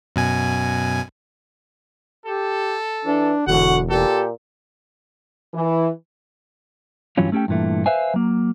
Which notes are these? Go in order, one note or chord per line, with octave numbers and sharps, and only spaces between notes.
F#2 B2 G#5
G4 A4
E3 D4
E1 D3 F#4 F#5
A#2 G4 A4
E3
G2 E3 F#3 C#4 F4
A3 C#4 G4 A4 G5
G2 A#2 E3 A3
B4 C5 E5 F5 G#5
F#3 A#3